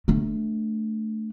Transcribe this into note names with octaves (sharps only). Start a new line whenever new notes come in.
A3 D4